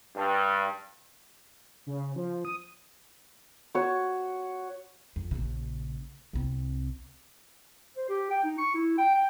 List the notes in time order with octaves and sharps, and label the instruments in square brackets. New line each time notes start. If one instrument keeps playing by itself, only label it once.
[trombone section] G2
[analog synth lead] C#3
F3
D#6
[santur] F#4 C#5
[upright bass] F2
A#1 C#3
C2 C4
[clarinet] C5
G4
G5
D#4
C#6
E4
G5
G5